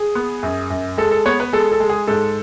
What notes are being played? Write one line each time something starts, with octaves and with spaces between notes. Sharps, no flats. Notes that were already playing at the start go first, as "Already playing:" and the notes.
Already playing: G#4
B3
F#2
F#2
G#3 A4
A4
B3 C#5
B4
G#3 A4
A4
G#3
G#4
G#2 A4